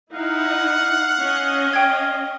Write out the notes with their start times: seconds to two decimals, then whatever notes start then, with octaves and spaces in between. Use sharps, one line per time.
0.14 D#4 E4 F5 F#5
1.23 C#4 D#5
1.73 G5 G#6